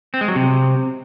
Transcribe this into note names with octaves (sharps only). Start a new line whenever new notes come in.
C4
G#3
F#3
C3